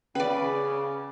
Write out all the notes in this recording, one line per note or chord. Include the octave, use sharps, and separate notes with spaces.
C#3 C#4 B4 D5